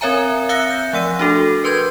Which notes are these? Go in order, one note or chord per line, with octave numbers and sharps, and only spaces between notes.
C4 A#4 C#5 E5 G#5 A#5
E5 F5 E6 F#6 A#6 C#7
G6 C#7
F3 A3 F#5 E6 D#7
D4 F#4 A4
A#4 B4 C6 G6 G#6